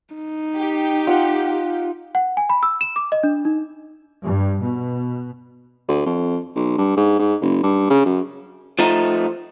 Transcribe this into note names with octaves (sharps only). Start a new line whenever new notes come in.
D#4
G4
F4 F#5
F#5
G#5
B5
E6
E7
D6
D#5
D4
D#4
G2
B2
D2
F2
B1
G2
G#2
G#2
F#1
G2
C#3
F#2
F3 A3 D#4